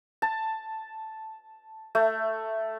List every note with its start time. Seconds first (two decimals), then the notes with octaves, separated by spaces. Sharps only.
0.22 A5
1.95 A3